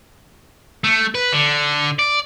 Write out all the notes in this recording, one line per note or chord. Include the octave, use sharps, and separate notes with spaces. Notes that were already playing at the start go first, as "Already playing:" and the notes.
A3
B4
D3
D5